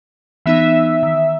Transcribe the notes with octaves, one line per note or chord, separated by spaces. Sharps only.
E3 B3 D#4 E5
D#3